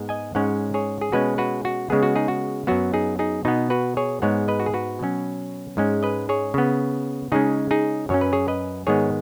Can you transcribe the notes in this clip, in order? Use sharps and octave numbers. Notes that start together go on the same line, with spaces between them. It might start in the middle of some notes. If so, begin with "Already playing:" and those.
Already playing: G#2 G#3 B3
D#5 G#5
G#2 G#3 C#4 C#5 F#5
G#4 C#5
G#4
B2 G#3 C#4 F#4 B4
F#4 B4
F#4
C#3 G#3 B3 G#4
F#4
D#4 G#4
F#4
F#2 F#3 B3 F#4
D#4 G#4
D#4 G#4
B2 B3 D#4
F#4 B4
G#4 C#5
G#2 G#3 B3 C#5 F#5
B4 D#5
F#4
G#4
F#4 B4
B2 F#3 C#4
G#2 G#3 C#4
B4 D#5
G#4 C#5
C#3 B3
C#3 G#3 C#4 D#4 G#4
D#4 G#4
F#2 F#3 C#4 C#5
B4
G#4 C#5
B4 D#5
G#2 D#3 G#3 B3 G#4 C#5